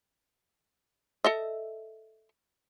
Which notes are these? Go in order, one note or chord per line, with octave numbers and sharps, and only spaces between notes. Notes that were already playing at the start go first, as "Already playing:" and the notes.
A4 D#5 E5